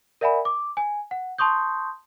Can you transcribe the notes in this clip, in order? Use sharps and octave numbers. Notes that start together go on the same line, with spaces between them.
A#4 D5 E5 F#5 G#5 B5
D6
G#5
F#5
A5 C6 C#6 D#6 G6